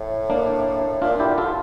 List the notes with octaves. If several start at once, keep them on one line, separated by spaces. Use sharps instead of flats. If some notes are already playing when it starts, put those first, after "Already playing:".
Already playing: A2
A#3 D4
A#2 D4 F4
E4 G4
D3
F4 A4